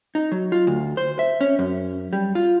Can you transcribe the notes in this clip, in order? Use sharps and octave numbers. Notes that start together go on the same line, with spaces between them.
D#4
F#3
F4
D2
C5
E5
C#4
F#2
G3
F4